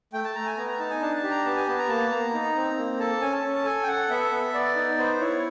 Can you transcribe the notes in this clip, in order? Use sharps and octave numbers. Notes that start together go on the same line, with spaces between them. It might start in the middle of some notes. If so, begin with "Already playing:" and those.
A3 G5
A5
A3 A#5
G#5
B3 A#5
A#5
D#4 A5
G#5
D4 A5
A5
G4
A#5
B3 A5
G#5
B3 A5
A#5
A#3 A5
A#3 A#5
D#4
C4
A#3
A4 A5
C#4 G#5
A5
C#4
A5
A4 G#5
G5
A4 F#5
B3 E5
B3
B3 D5
D#4
B3 C5
E4 C#5